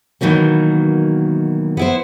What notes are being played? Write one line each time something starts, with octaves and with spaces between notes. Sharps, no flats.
B2 D#3 E3 F#3 A#3
B3 E4 C5